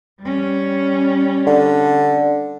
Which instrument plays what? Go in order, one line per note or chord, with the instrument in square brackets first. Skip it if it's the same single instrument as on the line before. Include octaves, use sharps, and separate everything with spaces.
[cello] G3 C#4
[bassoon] D3